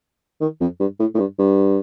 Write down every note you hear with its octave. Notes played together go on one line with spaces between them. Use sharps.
D#3
F2
G2
A2
A2
G2
G2